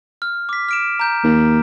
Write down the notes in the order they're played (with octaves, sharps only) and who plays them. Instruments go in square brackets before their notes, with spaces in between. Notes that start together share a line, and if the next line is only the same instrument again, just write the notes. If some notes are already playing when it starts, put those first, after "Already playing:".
[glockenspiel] F6
D6 B6
F6 D7 E7
A#5 G6
[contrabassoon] D#2